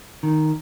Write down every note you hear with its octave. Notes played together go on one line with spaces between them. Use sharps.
D#3